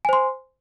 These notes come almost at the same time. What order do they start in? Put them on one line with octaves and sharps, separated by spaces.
G#5 C5 C6